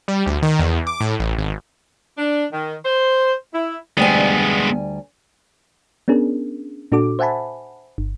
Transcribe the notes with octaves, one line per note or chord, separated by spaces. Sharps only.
G3
D2
D#3
E2
D6
A2
A1
G#1
D4
D#3
C5
E4
D2 G3 G#3 B3 G#5
B3 C#4 D4 G#4 A#4
A#2 D4 F#4 A4 D6
C5 E5 F#5 G#5 A5 B5
G1